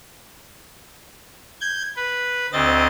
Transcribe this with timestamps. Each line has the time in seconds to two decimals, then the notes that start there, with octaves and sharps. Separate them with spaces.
1.61 G6 G#6
1.96 B4
2.53 D2 C4 D#5 A6